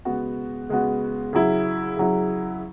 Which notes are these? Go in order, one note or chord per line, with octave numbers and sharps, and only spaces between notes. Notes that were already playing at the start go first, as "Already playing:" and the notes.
C#3 G#3 B3 F#4
C#3 G#3 B3 F#4
C#3 F#3 E4
C#3 F#3 E4